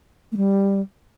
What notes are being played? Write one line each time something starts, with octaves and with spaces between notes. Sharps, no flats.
A3
G3